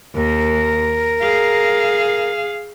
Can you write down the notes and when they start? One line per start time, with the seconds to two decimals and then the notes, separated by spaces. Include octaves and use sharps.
0.15 D#2 A#4
1.21 G#4 F5